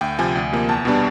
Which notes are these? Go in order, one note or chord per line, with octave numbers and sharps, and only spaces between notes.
D2 G5
C3 F3 G#5
D2
C3 F3 A#3
E2 A5
B2 G3 B3 D4